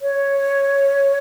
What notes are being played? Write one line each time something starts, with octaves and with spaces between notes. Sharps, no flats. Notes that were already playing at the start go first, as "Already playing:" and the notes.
C#5